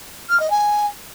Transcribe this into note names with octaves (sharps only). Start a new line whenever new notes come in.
F6
D#5
G#5